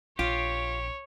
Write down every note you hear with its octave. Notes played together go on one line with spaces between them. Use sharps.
A#1 F4 G4 C#5